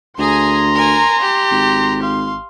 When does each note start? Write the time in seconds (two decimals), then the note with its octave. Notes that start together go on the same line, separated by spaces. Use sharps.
0.18 D2 G#4 G#5 A#5 C6
0.74 A#4 G#5
1.21 G4
1.51 G#1
2.03 F5 C6